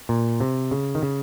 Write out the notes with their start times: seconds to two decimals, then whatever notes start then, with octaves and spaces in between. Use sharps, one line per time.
0.09 A#2
0.40 C3
0.71 C#3
0.95 D#3
1.03 C#3